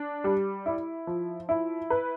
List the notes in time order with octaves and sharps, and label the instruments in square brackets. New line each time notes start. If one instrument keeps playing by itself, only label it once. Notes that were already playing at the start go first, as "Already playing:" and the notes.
Already playing: [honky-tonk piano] D4
G3
E4
F3
E4
B4